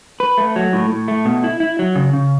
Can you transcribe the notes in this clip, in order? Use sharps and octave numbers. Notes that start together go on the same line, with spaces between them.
B4
A3
F#3
A2
A2
A3
B2
E4
E4
F#3
C#3
C#3